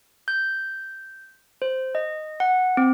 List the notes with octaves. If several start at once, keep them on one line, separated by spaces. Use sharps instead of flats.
G6
C5
D#5
F#5
C4